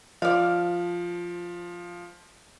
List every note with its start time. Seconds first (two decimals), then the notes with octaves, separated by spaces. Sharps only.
0.22 F3 D5 F5